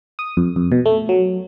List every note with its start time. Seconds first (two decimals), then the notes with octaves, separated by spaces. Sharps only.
0.19 D#6
0.37 F2
0.56 F2
0.72 B2
0.86 A3
1.09 F#3